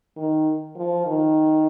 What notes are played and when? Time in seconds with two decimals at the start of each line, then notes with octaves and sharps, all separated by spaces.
0.17 D#3
0.76 F3
1.06 D#3